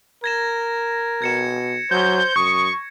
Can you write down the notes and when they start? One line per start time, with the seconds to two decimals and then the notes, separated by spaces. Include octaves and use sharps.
0.24 A#4 G#6 A#6 E7
1.22 B2 G#6 C#7 E7
1.91 F#3 C5 G6
2.36 F#2 C#6 D#6